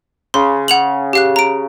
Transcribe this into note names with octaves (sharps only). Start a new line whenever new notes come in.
C#3 C6
F#5 F7 F#7
G4 F5 F#6
A#5 D7